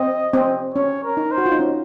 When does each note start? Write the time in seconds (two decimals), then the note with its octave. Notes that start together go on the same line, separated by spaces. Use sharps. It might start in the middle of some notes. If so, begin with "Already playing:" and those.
Already playing: C4 D#5
0.33 C4
0.74 C#4 C#5
1.04 A#4
1.17 D#4
1.31 C5
1.38 F#4
1.46 F4
1.52 D#4
1.59 C#4